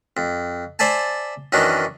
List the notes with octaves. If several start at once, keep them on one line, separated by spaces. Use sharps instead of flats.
F2
C5 D5 E5 G#5 A5
F#2 D#3 E3 D4 D#4